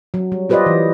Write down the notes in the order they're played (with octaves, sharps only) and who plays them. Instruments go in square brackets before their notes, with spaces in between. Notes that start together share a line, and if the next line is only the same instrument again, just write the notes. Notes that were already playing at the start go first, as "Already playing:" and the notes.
[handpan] F#3
G3
F4 G4 B4 C5 D5 D#5
E3